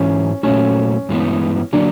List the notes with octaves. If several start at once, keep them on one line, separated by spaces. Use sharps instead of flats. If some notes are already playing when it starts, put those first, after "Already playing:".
Already playing: G#2 E3 G#3 C#4
A#2 F#3 A3 C#4
G2 E3 G#3 B3
D3 F#3 A#3 D4